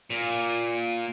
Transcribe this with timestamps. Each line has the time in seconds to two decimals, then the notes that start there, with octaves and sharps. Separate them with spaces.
0.10 A#2